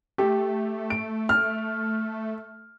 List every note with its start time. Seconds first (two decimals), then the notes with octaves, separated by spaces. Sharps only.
0.18 A3 G4
0.90 D7
1.29 F6